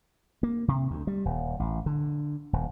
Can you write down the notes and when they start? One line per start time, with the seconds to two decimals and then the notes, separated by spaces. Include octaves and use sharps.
0.43 A#3
0.68 C3
0.91 D2
1.07 G3
1.25 D#1
1.60 A1
1.86 D3
2.53 D#1